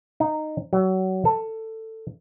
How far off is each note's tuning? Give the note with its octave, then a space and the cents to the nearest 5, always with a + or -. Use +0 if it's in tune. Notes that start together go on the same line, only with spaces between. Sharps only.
D#4 -10
F#3 +25
A4 +15